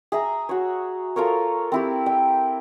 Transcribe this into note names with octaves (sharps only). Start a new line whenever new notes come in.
G#4 E5 A#5
F#4 C#5
F4 A4 A#4 C#5
C4 E4 G4
G5